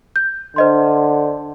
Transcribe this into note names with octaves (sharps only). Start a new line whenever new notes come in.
G6
D3 C5 D#5 C6